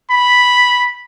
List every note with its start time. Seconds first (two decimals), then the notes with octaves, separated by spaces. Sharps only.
0.10 B5